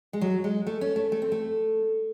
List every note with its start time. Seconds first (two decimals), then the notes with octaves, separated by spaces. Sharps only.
0.13 G#3
0.21 F#3
0.44 G#3
0.67 A3
0.81 C#4
0.96 A3
1.12 A3
1.22 C4
1.32 A3